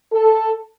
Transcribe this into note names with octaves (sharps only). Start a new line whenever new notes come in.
A4